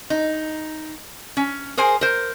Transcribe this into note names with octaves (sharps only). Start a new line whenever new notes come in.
D#4
C#4
G#4 A#4 C5 G#5
A#4 C5